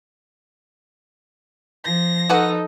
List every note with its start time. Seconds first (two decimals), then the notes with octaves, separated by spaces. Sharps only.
1.85 F3 A#6
2.29 D#4 F#4 A4 B4 F#5